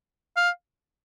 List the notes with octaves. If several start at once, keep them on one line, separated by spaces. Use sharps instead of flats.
F5